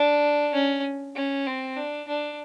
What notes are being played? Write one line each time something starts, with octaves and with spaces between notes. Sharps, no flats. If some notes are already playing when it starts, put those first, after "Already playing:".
Already playing: D4
C#4
C#4
C4
D4
D4